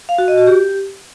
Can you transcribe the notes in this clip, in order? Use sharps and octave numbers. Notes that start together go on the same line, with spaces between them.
F5
F#4
D#5
F#4
G4